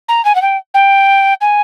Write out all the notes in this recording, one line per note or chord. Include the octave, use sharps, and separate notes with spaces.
A#5
G#5
F#5
G5
G5
G#5